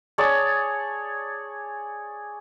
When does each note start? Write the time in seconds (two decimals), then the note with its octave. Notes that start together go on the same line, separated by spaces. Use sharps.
0.18 G#4 C#5 D5 A5